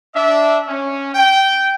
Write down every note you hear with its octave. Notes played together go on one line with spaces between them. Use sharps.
D4 E5
C#4
G5